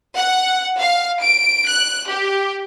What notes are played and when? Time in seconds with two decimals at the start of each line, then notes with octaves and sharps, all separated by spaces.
0.16 F#5
0.79 F5
1.21 D7
1.67 F#6
2.07 G4